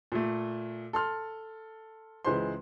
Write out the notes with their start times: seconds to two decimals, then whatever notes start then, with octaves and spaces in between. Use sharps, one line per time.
0.12 A#2 A3
0.93 A4 C6 F6
2.25 C#2 E3 G#3 B4 C5 C6